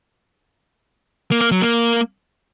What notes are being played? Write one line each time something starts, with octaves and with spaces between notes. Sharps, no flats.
A#3
A#3
F#3
A#3